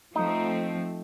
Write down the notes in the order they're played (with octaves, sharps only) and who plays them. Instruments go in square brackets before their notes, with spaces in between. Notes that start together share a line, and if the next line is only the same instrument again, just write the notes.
[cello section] F3 A3 C4 [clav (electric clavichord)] D#4